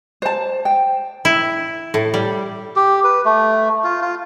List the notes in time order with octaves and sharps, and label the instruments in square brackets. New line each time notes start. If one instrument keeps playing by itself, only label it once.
[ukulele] C5 A5
G5
[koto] E4
A2
G3
[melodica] G4
B4
A3
F4
F4